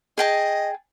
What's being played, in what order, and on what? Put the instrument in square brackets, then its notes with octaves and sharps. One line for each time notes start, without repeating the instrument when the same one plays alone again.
[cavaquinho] G#4 G5 A5 [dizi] D#5